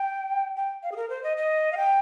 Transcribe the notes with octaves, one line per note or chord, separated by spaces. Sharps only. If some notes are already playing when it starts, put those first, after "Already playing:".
Already playing: G5
G5
F5
G#4
A#4
C5
D#5
D#5
F5
G5